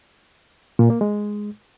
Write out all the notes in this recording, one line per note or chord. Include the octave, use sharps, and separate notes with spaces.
A#2
A#3
G#3